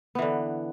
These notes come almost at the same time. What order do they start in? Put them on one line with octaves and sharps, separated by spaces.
B3 E3 D3